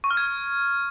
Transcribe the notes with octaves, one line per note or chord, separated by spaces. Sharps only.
C#6
F6
G#6